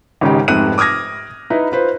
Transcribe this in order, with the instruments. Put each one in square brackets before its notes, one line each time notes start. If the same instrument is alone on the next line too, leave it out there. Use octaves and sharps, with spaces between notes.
[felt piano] G#1 C#3 D#4 G4
F1 G#2 C3 F#6 D#7
D6 D#6 F6 G#6 A#6
D#4 E4 B4
F4 B4 C5